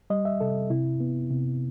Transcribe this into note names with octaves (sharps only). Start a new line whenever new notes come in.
G3 D#5
E5
C3 A4
C3 E4
B3
C3